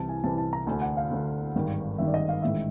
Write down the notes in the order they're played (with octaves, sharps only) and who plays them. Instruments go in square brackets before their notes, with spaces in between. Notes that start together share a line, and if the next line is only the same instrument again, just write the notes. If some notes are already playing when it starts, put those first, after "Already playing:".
Already playing: [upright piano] C2 C3 E3 A5
G#5
C2 C3 E3 A5
A5
A#5
D2 D3 G#5
F#5
F5
D2 D3
G#1 G2 D#3
G#1 G2 D#3 E5
D5
D#5
F5
A1 G#2 D#3 E5